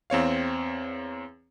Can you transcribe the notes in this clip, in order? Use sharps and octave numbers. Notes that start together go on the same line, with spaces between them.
E2 C4 C#5 F5